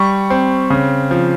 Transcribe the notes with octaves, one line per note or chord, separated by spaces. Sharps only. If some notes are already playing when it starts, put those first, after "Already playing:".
Already playing: G3 C#6
C4
C#3
F3